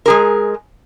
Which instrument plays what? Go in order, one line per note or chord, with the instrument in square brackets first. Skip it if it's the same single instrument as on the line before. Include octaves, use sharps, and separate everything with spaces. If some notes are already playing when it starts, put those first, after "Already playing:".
[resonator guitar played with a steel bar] G#3 G#4 A#4